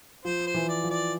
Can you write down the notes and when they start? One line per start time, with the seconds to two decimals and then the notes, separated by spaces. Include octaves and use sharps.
0.25 F3 C5
0.47 C5
0.54 E3
0.69 D5
0.83 F3
0.90 D5